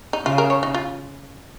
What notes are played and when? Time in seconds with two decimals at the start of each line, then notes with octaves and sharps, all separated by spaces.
0.13 D#4
0.25 C#3 F4
0.38 A#4
0.50 C#5
0.63 D#4
0.74 F4